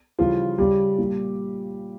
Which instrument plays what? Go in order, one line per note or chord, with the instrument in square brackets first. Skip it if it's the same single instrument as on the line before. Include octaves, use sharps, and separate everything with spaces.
[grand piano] C#3 E3 F3 G3 F4
C#3 G3 G4
A#2 G3